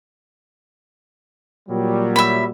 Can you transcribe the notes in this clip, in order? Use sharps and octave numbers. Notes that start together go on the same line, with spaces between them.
A#2 F#3 G3
E5 B5